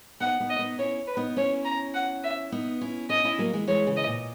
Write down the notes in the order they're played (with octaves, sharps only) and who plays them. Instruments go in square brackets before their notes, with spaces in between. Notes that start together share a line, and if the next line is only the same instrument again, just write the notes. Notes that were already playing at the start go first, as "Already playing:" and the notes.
[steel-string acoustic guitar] B3 D#4 [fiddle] F#5
[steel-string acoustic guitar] B3 D#4
[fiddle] D#5
[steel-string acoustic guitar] B3 D#4
[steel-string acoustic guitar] C#4 E4 [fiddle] C#5
[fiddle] B4
[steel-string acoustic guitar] B3 D#4
[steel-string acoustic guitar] C#4 E4 [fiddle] C#5
[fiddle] A#5
F#5
E5
[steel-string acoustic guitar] B3 D#4
C#4 E4
[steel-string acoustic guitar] C#4 E4 [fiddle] D#5
[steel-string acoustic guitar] C#4 E4
F#3 A#3
E3 G#3
[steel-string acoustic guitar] E3 G#3 [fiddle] C#5
[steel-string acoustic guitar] C#3 E3
[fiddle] D#5
[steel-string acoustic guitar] A#2